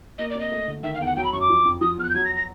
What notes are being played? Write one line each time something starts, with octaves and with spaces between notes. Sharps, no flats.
A#3 D#5
D5
C3 D#5
A3
D3
D#3 E5
F5
E2 G5
F#5
F#3 G5
B5
F#2 C#6
D6
F3
F2
F3 D#6
E2 F6
F#6
G6
F#3 G#6
A#6
A#6